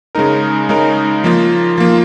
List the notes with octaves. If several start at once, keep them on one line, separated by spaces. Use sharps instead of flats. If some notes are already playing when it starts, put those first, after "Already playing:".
C#3 G#3 D#4 A#4
C#3 G#3 D#4 A#4
F3 A#3 F4
F3 A#3 F4